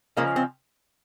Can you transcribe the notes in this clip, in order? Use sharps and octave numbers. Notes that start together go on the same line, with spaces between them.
C#3 F3 G#3 A#3
C4